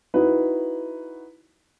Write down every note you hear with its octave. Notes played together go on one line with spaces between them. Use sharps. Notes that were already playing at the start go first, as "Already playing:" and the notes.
D#4 E4 F#4 B4